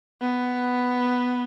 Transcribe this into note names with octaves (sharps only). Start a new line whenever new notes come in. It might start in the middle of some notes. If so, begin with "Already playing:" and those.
B3